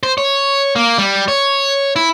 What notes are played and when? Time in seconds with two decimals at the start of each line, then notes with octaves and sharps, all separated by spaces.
0.03 C5
0.18 C#5
0.76 A#3
0.98 G3
1.28 C#5
1.96 E4